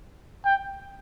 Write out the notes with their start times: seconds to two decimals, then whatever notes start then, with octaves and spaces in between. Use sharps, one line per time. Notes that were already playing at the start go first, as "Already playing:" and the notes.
0.45 G5